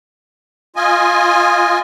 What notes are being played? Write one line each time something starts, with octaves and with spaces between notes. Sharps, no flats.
F4 D#5 G#5